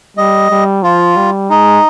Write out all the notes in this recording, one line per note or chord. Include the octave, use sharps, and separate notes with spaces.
G3 D#5
G3
F3 F4
G3
G#3 D#4